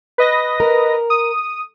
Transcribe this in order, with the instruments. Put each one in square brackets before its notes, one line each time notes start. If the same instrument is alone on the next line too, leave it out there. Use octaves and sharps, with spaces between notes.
[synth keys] B4 D#5 A#6
[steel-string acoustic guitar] A#4
[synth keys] D#6